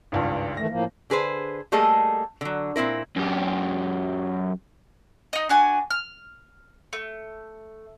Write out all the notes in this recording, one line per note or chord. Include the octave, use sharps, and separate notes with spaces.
G#1 C#2 G2
D#3 E3 A3 A#6
A2 F3 A#3
D3 G#4 B4 C5
G3 A3 A#3 G#4 A4 D#5
D3 F#3
A#2 C4 E4 A#4
F#2 G4
D#4 D#5
D4 F#4 G#5
F6
A3